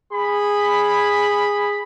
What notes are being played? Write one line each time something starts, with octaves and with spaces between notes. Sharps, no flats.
G#4 B5